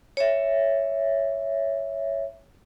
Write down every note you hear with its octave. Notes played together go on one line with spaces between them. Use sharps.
C#5 E5